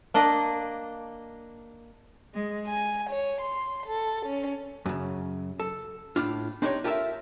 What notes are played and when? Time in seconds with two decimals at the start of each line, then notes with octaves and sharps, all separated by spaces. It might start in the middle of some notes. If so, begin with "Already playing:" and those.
0.14 A#3 D4 D#5
2.34 G#3
2.68 G#5
3.10 C#5
3.42 C6
3.87 A4
4.26 C#4
4.86 F#2 C#3
5.60 A4
6.16 A2 D4 F4
6.62 C4 D4 D#4 G4 C5 C#5
6.84 F4 G4 A4 A#4 D5 E5